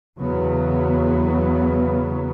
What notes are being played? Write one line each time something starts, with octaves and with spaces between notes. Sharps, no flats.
E2 C#3 F#3 B3